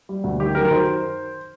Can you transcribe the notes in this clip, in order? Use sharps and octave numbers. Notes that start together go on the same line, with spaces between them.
G3
D2
D#3 G4
F#2 A#4
A#4
D#3 C5